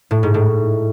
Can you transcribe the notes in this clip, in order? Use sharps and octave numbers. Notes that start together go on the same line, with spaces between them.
A2
G#2
A2